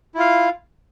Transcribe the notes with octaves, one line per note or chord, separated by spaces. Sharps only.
E4 F4 F5